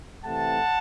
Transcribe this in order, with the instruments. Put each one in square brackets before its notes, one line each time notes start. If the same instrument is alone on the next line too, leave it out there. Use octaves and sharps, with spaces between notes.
[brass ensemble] C3 E3 A3 C4 F#5 A5